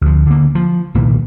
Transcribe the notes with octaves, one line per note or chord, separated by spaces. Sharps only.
D2 F3
D3 A#3
F3
C2 A#2 D#3 A#3